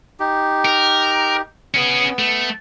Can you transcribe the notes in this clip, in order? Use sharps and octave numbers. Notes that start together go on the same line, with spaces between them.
D#4 G4
A#4
B3 C#4 G#4
A3